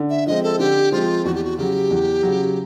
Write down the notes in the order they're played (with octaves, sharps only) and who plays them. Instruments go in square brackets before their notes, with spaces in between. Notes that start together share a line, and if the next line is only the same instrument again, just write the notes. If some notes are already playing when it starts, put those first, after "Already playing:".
Already playing: [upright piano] D3
[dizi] E5
[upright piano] F3 G#3 C4 [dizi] D#5
[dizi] A4
[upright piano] D3 [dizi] G4
[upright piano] F3 G#3 C4 [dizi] F4
[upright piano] E2 [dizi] F#4
[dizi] G4
F#4
[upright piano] C#3 F#3 [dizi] G4
[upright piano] E2
C#3 F#3